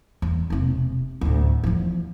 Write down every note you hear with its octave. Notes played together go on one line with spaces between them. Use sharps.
E2
E1 C3
D2 A2
E2 F3